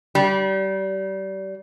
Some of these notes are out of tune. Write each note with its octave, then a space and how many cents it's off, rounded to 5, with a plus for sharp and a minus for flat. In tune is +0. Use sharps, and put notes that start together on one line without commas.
G3 -30